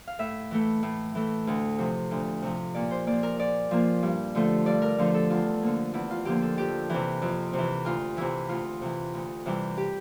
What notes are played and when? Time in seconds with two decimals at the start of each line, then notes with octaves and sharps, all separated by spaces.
0.07 F5
0.19 A2 E5
0.51 E3 A3
0.83 A2
1.15 E3 A3
1.47 D2
1.78 C3 F3
2.11 D2
2.42 C3 F3
2.74 A#2 D5
2.91 C5
3.07 F3 A#3 D5
3.23 A#4
3.39 A#2 D5
3.71 F3 A#3
4.03 G2
4.35 D3 F3 A3
4.66 G2 D5
4.82 A#4
4.98 D3 F3 A3
5.14 A4
5.30 E2 F4
5.63 D3 F3 A#3
5.94 E2 E4
6.11 F4
6.25 D3 F3 A#3 G4
6.42 A4
6.57 F2 G4
6.90 C3 E3
7.22 F2
7.53 C3
7.58 E3
7.85 D2 F4
8.17 C3 E3 E4
8.49 D2 F4
8.81 C3 E3
9.14 D2
9.46 C3 E3 G3
9.78 G4